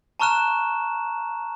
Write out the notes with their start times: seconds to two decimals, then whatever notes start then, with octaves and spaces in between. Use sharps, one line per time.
0.20 A5 A#5 C#6 F6 F#6 E7